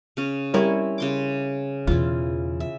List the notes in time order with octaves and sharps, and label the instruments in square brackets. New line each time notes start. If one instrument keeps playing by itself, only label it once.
[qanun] C#3 C#4
[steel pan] G3 A#4 C#5 [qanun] C4 C#4 E4
[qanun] C#3 C6 D6
[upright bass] E2 B2 [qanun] E4 F4
[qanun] E5